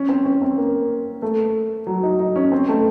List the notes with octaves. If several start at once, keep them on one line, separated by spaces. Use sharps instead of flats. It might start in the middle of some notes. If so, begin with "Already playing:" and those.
Already playing: C#4
C4
C#4
C4
A#3
A3
F#3
D#4
D#4
C#4
C4
A3